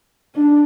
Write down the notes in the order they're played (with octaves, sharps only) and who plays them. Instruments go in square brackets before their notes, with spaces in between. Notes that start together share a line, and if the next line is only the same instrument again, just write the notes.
[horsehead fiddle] D4